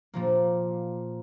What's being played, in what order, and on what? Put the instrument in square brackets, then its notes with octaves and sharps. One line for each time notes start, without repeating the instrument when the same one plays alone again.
[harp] A#2 F3 A#3